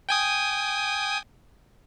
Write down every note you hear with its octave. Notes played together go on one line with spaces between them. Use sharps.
G5 G#5 D#6